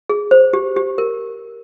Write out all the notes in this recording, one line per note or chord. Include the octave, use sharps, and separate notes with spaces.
G#4
C5
G4
G4
A#4